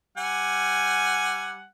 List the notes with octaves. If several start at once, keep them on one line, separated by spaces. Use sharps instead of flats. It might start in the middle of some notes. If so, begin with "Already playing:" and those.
G3 F#5 G#5